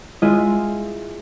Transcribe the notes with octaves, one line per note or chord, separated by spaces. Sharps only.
G#3 E4 F4 D#5 E5 G#5